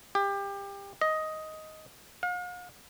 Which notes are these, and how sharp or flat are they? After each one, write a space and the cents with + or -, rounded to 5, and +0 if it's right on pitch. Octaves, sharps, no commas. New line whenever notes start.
G4 +25
D#5 +10
F5 +45